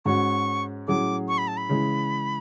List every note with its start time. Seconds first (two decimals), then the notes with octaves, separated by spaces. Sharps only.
0.05 G#2 G#3 C#4 F#4 C#6
0.88 A2 F#3 C#4 G#4 D6
1.28 C#6
1.38 B5
1.48 A5
1.57 B5
1.69 C#3 E3 G#3